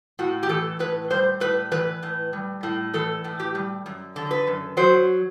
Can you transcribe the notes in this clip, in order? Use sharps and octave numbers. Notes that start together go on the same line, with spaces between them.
A2 F#4
G4
E3 A4
A2 B4
G3 C5
A2 B4
E3 B4
A2
G3
A2
E3 A4
A2
G4
G3
F#2
D3
B4
F#2
F#3 C5